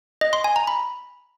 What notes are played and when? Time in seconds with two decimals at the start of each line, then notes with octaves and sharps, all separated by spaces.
0.21 D#5
0.33 C6
0.44 G#5
0.56 A#5
0.67 B5